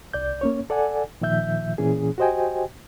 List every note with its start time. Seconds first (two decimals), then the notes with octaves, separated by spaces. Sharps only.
0.14 C2 D5 G6
0.41 A#3 C#4 C#5
0.70 A4 D5 F#5 G#5
1.21 A#2 D#3 F3 E5 G6
1.78 A#2 E3 C#4 G#4
2.18 F#4 G4 C5 D#5 G5 G#5